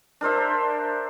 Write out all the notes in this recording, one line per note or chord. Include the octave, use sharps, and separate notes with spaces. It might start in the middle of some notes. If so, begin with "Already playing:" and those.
D4 A#4 C5 E5